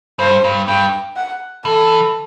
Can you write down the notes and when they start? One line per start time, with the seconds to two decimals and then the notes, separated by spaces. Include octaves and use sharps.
0.19 G2 C5
0.44 G2
0.68 G2 G5
1.17 F#5
1.65 E3 A4